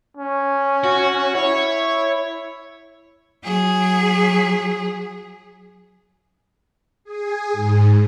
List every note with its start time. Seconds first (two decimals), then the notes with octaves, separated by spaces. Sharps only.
0.17 C#4
0.84 F#4
1.35 E4 C#5
3.44 F#3 G#4
7.04 G#4
7.52 G#2